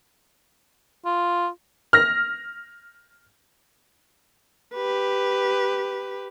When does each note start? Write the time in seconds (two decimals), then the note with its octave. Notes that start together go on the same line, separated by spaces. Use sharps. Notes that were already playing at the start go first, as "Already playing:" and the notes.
1.05 F4
1.93 F6 A#6
4.75 G4 B4